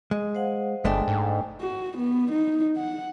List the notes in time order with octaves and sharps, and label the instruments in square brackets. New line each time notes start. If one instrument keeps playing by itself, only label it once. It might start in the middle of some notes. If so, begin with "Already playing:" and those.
[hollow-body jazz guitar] G#3
[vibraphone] C5 F5 F#5
[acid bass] G1 [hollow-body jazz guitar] G#3 A3 D4 [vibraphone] G5 G#5
[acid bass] G#2
[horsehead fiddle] F#4
B3
D#4
F#5